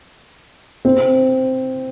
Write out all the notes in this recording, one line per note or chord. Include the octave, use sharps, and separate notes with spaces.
C4